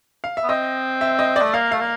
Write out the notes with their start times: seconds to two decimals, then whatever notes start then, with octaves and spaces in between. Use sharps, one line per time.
0.24 F5
0.37 E5
0.43 B3
0.49 C4 D#5
1.01 E5
1.19 D#5
1.36 D5
1.41 A3
1.53 A#3 F5
1.72 A3 F5
1.80 A#3